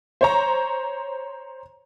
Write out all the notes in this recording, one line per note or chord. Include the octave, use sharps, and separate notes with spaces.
C5 C#5 A#5